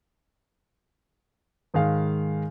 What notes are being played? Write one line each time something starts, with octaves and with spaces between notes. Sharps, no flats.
G#2 D#3 G#3 F5